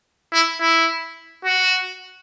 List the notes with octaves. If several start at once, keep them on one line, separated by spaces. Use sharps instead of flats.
E4
E4
F#4